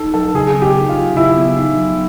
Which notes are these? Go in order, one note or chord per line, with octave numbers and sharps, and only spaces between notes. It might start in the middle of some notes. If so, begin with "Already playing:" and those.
Already playing: D#4 A4
F#3 A4
C#3 G#4
B3
G4
D#4
F4
F#3
C#3 E4
B3
D#4
F#3